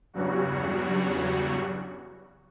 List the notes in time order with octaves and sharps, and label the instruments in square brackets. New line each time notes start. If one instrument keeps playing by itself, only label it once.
[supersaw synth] E2 G2 C#3 F#3 G3 F#4